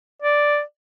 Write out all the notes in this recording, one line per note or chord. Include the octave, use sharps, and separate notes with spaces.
D5